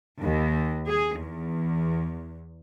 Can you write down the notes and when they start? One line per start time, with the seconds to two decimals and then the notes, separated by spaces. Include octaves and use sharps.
0.21 D#2
0.86 G#4
1.17 E2